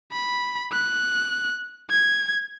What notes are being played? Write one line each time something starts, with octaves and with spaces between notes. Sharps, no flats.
B5
F#6
G#6